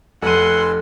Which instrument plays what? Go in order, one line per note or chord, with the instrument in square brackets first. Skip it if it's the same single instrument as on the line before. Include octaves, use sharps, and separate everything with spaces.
[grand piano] F1 D#7 [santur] A4 [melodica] B4 G#5 E6 [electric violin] F#5 C6